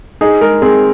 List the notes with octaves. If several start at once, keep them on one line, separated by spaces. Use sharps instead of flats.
D#4 G#4
G#3 A#4
C4 G#4